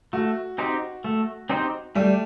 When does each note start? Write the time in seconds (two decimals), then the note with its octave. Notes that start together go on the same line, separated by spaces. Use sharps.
0.13 A3 F#4
0.58 C4 D#4 G4 C5
1.04 A3
1.49 C4 D#4 G4 C5
1.95 G3 A3